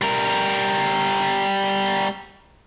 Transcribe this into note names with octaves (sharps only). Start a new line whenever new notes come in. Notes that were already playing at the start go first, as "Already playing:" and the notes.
G3 A#4